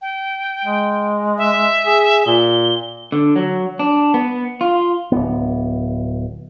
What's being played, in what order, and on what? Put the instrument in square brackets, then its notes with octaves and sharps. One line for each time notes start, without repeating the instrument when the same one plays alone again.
[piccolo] G5
[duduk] G#3
[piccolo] E5
[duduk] G#4
[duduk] A#2 [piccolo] G7
[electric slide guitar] D3
F#3
D4
B3
F4
[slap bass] D1 B3